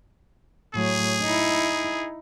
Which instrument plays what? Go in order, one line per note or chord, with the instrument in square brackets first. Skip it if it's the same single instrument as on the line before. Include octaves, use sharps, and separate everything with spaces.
[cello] A2 F#3 [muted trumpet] G#4
[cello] D#4 E4